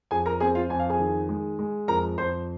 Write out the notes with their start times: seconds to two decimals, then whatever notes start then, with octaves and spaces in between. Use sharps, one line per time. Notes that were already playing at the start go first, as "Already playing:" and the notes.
0.11 F2 G#4 G#5
0.26 A#4 A#5
0.40 C4 G#4 G#5
0.55 F4 F5
0.70 F2 G#5
0.80 F5
0.89 G#4 G#5
0.99 D#3
1.29 G#3
1.59 G#3
1.88 F2 A#4 A#5
2.18 F2 C5 C6